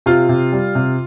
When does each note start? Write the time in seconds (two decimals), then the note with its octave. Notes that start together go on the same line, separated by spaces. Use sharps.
0.06 C3 F4
0.29 C3
0.53 G3
0.75 C3